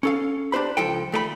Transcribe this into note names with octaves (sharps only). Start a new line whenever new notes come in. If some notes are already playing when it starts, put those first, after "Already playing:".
C#4 A4 F5
D4 G4 C5 B5
C#2 F3 A4 G5
D#2 A3 G4 B5